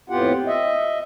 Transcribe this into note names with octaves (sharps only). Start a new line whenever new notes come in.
F2 A2 B3 F4 G4 F#5
D#5 E5